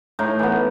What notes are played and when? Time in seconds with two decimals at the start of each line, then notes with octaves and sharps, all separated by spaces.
0.19 A2 D#4
0.39 E3 B3